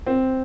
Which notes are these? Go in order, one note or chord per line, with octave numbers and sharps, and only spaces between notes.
C4